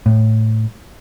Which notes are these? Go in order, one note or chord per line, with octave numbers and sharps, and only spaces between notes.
A2